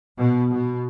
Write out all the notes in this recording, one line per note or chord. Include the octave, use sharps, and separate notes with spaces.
B2
B2